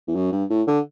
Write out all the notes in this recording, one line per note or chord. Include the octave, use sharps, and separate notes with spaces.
E2
F#2
G2
A2
D3